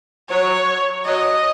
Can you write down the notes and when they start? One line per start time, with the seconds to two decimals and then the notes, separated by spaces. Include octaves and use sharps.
0.30 F#3 C#5
1.06 F#3 D#5